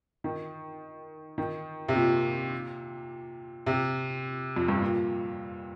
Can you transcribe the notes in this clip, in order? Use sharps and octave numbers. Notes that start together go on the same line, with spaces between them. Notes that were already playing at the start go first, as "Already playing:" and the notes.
D#3
D#3
C3
A#2
C3
F2
G2
A#2